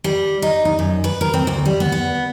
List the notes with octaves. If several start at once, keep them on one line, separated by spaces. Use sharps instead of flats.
G3
D#4
D#4
F#2
B4
A#4
C4
D2
G3
B3
B3